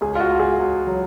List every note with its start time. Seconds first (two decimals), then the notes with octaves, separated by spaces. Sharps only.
0.01 C#2 G#4
0.15 F4
0.20 F#4
0.30 C#2
0.39 G#4
0.59 C#2
0.87 F#3